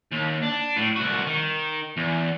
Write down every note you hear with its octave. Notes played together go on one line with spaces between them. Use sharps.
D#2
D4
A2
C2 F#4
D#3
E2